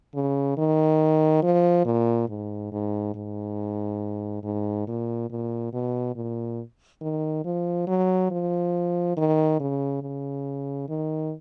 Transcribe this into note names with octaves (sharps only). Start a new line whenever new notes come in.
C#3
D#3
F3
A#2
G#2
G#2
G#2
G#2
A#2
A#2
B2
A#2
D#3
F3
F#3
F3
D#3
C#3
C#3
D#3